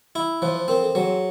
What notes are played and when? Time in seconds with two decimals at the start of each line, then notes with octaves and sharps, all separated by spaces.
0.15 E4
0.42 F3 C5
0.56 C5
0.68 C4 A#4
0.83 A4
0.95 F#3 G#4